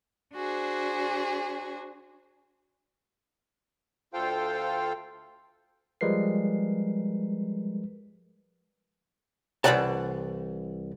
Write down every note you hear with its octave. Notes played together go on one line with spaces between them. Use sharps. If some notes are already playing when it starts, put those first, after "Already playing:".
D4 F#4 G#4 C5
D2 F4 A4 C5 F5 G5
F3 G3 G#3 A#4 B4 C7
C2 G2 E3 D5 F#5 A5